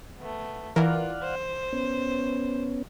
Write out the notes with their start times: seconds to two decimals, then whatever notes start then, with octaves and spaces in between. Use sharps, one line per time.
0.19 A3 B3
0.76 E3 F4 A#4 D5 F5 F#5
1.22 C5
1.73 B3 C#4